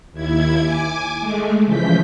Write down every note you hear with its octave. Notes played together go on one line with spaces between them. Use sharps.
D#2 E4 G#6
G#5 D6
G#3 A3
C#3 E3 F3 G6 B6